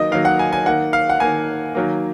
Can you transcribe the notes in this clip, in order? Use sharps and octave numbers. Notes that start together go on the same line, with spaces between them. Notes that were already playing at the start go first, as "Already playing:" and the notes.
Already playing: D#3 F#3 A#3 D#5
D#3 F#3 A#3 F5
F#5
G#5
G#5
D#3 A#3 F#5
F5
F#5
D#3 A#3 G#5
D#3 F#3 A#3